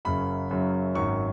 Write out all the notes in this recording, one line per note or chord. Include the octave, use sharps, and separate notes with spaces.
F#1 F#2 C#3 F#3 B5
F#1 F#2 C#3 F#3
G#1 F#2 D#3 F#3 C#6